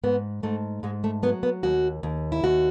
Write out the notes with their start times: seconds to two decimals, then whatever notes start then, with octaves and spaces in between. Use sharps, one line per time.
0.03 G#2 B3
0.43 G#2 A3
0.83 G#2 G#3
1.04 A3
1.23 F#3 B3
1.43 B3
1.63 D#2 F#4
2.03 D#2
2.32 E4
2.44 D#2 F#4